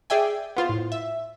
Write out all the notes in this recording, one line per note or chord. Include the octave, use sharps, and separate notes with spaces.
G#4 D5 E5 G5 G#5
B3 F4 C5
A2
E5